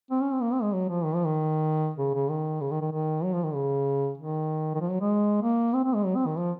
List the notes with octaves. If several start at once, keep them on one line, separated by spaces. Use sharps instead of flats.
C4
C#4
C4
A#3
C4
G#3
F#3
F3
D#3
F3
D#3
C#3
C#3
D#3
C#3
D#3
D#3
D#3
F#3
F3
D#3
C#3
D#3
D#3
F3
F#3
G#3
A#3
C4
C4
G#3
F#3
C4
D#3
F3